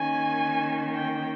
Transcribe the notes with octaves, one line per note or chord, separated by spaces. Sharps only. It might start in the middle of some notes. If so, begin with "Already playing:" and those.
Already playing: D#3 A#3 C#4 G#5
G5